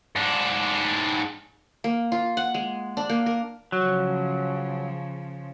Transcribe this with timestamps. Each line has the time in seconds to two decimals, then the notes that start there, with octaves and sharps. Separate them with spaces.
0.16 G#2 D4
1.84 A#3
2.12 F4
2.37 F#5
2.54 G#3
2.97 D4
3.09 A#3
3.26 A#4
3.72 C#3 F3 F#3